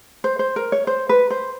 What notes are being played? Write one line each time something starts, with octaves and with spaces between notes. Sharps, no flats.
C5
C5
A#4
C#5
C5
B4
C5